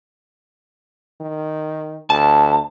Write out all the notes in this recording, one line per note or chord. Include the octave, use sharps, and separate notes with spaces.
D#3
D2 A5